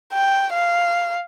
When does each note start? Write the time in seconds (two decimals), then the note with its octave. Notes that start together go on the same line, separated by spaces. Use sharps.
0.13 G5
0.53 F5